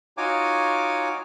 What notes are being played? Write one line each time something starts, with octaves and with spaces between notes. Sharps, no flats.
D#4 F4 F#4 C#5 G#5 D6